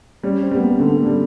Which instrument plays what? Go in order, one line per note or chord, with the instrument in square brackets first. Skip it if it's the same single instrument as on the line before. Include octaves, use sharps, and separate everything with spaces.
[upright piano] G3 [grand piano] C#4
[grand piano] C4
[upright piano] G3 [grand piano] B3
[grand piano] A#3
[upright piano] D3 [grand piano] A3
[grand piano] A3
[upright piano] G3